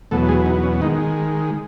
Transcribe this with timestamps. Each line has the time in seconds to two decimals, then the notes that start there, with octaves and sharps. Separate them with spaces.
0.11 E2 B2 F#3 A3 B3 A4
0.29 G#3 G#4
0.46 D#4
0.63 C#4
0.81 D#3 G#3 D#4